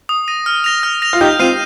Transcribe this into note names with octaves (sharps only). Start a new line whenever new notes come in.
D#6
A#6 D#7
F6
A#6 F7
F6
A#6 F7
F4
D#4 G4 G6
C4 F4 C7 D#7